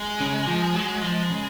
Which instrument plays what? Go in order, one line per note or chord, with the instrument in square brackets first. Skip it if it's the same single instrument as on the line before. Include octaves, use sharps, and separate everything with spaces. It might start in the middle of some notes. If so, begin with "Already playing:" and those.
Already playing: [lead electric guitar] G#3
[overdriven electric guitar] C#3
F3
F#3
F3
C#3